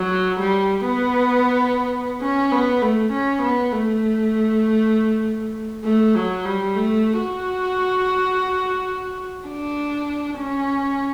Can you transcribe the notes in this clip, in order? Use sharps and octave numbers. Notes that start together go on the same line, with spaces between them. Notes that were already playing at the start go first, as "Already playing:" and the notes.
Already playing: F#3
G3
B3
C#4
B3
A3
C#4
B3
A3
A3
F#3
G3
A3
F#4
D4
C#4